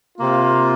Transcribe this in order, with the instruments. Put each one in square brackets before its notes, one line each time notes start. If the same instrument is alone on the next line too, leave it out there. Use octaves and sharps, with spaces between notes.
[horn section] C3 A#3 F4